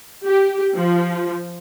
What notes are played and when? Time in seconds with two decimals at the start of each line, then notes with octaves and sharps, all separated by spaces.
0.25 G4
0.74 F3